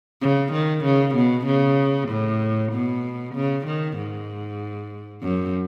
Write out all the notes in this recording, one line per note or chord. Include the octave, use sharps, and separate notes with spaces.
C#3
D#3
C#3
B2
C#3
A2
B2
C#3
D#3
G#2
F#2